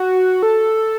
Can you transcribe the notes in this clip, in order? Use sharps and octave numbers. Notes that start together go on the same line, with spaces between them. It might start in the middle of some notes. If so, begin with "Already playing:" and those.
Already playing: F#4
A4